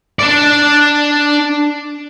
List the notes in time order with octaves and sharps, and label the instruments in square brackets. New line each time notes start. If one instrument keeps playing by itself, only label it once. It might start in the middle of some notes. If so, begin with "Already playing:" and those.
[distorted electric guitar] D4 D5